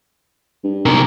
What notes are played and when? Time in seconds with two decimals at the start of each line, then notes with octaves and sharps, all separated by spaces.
0.64 G2
0.86 B1 C3 A#4